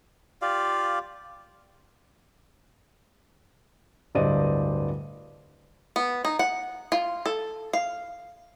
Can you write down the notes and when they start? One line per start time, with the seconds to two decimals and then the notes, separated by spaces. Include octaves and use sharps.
0.42 F4 G4 D5 F5
4.15 D1 G2 C5 D5 D#5 D#7
5.96 B3
6.25 D#4
6.39 F#5
6.92 F4
7.26 A4
7.73 F5